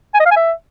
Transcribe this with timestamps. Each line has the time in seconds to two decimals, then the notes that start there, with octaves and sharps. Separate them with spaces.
0.14 G#5
0.20 D#5
0.26 F5
0.31 G#5
0.37 E5